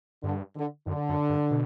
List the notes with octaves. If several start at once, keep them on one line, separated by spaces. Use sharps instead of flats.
G2 D3
D3
F#2 D3
F#2
G2
B2